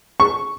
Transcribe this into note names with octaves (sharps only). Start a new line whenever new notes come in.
C#6